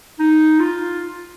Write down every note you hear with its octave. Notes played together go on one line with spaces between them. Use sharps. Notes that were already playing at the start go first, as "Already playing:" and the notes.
D#4
F4